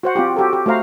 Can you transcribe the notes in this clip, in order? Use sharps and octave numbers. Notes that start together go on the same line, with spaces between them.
F#4 C5 F#5
C4 F4 G4
F#4 G4 A4
G4
A3 F#4 C5 F5 A#5